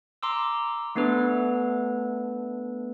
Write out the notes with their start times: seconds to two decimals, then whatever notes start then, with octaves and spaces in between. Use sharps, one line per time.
0.23 A#5 C6 D6 E6
0.95 A3 B3 D4 A4 B4